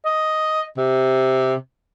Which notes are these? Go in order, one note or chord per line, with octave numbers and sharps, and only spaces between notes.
D#5
C3